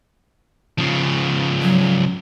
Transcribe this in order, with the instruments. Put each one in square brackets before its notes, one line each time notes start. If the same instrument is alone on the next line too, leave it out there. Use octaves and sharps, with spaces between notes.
[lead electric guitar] C#3 F3
[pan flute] F#3